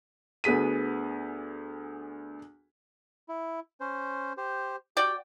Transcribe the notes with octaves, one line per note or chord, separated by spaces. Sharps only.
D2 B3 G#4 B6 D#7
E4
C#4 C5
G4 C5
F#4 G4 D5 G5